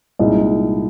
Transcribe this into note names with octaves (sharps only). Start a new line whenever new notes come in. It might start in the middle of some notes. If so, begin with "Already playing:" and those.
C2 A#2 G#3 D#4